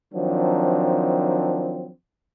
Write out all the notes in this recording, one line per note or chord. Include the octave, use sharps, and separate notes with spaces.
D#3 F3 F#3 C4 D4